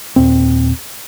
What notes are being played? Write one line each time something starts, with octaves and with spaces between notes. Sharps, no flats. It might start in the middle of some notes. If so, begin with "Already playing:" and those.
D#2 A#2 C4